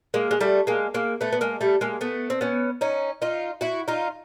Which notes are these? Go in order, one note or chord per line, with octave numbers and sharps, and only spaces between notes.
G#3 A#3
G#3
G3 A3
G#3 A#3
G#3 A#3
A3 B3
B3
G#3 A#3
G3 A3
G#3 A#3
A3 B3
C4
B3 C#4
C#4 D#4
D#4 F4
E4 F#4
D#4 F4